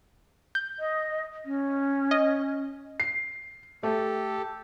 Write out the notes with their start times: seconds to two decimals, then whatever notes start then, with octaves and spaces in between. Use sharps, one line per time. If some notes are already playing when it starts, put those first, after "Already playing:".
0.55 G6
0.79 D#5
1.45 C#4
2.11 D#5
3.00 C7
3.83 A3 G4 A4